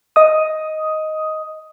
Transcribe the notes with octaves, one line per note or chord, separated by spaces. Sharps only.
D#5 D#6